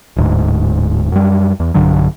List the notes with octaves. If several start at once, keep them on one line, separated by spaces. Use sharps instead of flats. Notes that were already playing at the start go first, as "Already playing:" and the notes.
D1 D2 G#2
F#2 G3
E2
B1 G2 D3 F#3